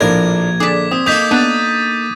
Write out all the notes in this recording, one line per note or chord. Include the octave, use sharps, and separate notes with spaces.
A#1 A2 A#3 D4 A#4 G#6
D3 G#4 D5 D6 B6
C4 D#6
A#3 D#4 A4 D#6 G6 B6 F7
B3 D4 F#6 A6 D#7